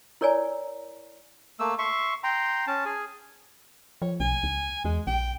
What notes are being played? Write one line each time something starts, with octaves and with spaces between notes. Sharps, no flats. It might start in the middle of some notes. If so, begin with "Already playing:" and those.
E4 A#4 C#5 D5 G#5 A#5
A3 A#3 E6
E5 C6 C#6
G5 A#5 C6
C#4 A5
G#4 G#5
F3 C#5
B1 G#5
C#2
E2 G#3
A#1 G5